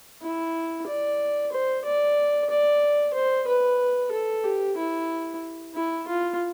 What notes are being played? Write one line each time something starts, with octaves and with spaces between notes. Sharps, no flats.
E4
D5
C5
D5
D5
C5
B4
A4
G4
E4
E4
F4